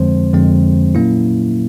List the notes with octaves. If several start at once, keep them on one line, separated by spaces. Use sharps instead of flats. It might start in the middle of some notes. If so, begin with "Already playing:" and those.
Already playing: F2 D3 F3 G#3 C4 C5
F2 D3 F3 G#3 C4
A#2 F#3 A#3 C#4 E4